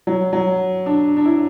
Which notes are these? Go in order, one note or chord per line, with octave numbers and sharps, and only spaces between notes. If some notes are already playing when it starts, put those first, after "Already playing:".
F#3
F#3
D4
D4
E4